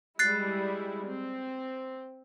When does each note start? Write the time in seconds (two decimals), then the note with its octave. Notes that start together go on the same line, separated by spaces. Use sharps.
0.19 G3 G#3 E4 F#6 A6 C7
1.07 C4